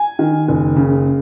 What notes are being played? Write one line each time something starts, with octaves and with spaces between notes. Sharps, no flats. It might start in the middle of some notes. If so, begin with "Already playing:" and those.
Already playing: G#5
D#3
F#1
C#3